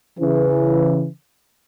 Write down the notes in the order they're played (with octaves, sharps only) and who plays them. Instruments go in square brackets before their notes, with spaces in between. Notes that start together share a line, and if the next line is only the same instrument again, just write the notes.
[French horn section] C#3 E3